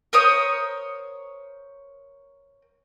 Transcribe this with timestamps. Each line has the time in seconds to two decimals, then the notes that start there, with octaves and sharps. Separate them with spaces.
0.13 A#4 C5 C#5 D#6